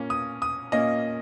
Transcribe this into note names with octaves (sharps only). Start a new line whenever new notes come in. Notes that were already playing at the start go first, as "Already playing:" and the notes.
Already playing: A#2 A#3 C#4
D#6
D#6
A#2 A#3 C#4 D#5